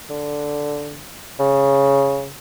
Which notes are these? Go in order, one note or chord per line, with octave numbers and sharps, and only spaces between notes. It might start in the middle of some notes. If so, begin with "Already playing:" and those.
D3
C#3